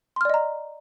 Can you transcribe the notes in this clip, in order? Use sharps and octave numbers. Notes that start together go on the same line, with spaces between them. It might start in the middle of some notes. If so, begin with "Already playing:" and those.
D5 D#5 A#5 C6 F6